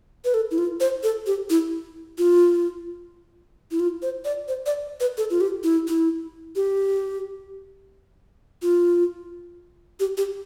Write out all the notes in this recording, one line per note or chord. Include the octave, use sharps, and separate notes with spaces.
B4
A4
E4
F4
C5
A4
G4
E4
F4
E4
F4
C5
D5
C5
D5
B4
A4
F4
G4
E4
E4
G4
F4
G4
G4